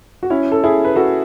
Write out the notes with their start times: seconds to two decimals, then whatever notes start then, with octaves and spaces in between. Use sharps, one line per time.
0.23 F#4
0.30 C#4 E4
0.52 A4
0.64 E4 G#4
0.85 B4
0.95 F#4 A4